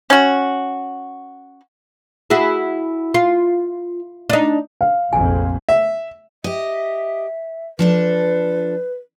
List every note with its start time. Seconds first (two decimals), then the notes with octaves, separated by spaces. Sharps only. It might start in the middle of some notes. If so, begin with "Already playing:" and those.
0.10 C#4 F#4
2.30 E4 F#4 G#4
3.14 F4
4.30 D4 D#4
4.81 F5
5.13 F1 A#1 F2 G#5
5.69 E5
6.44 G4 D#5 E5
7.79 F3 D4 A4 B4